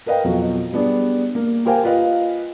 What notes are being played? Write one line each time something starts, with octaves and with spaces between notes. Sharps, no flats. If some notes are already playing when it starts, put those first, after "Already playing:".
A#4 B4 D#5 F5 G5
F2 B2 F#3
G3 B3 D4 G#4
A#3
G4 A#4 C5 F5 G5 G#5
F4 B4 D#5 F5